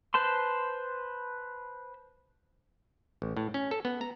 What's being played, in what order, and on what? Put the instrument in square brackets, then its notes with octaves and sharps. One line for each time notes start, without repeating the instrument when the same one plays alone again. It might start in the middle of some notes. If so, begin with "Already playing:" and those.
[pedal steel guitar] B4 C5 A5 C6
[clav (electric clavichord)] A1
A2
C#4
A4
B3
A#5